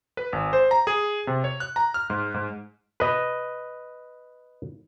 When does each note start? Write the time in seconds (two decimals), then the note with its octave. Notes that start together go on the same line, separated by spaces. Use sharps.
0.17 B4
0.33 G#1
0.53 C5
0.71 A#5
0.87 G#4
1.27 C3
1.44 C#5
1.60 F#6
1.76 A#5
1.94 F6
2.10 G#2
2.34 G#2
3.00 B4 D#5